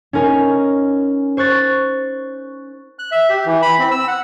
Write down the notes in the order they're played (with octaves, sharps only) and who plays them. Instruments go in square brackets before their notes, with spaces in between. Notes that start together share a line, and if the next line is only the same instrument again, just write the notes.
[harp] C#4 D#4 A#4 G#5
C5 C#6 F#6 A6
[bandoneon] F#6
E5
G4
E3
B5
C4
E6
F#5